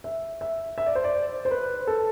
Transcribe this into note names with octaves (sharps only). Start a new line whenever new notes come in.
E5
E5
E5
D5
C5
D5
C5
B4
A4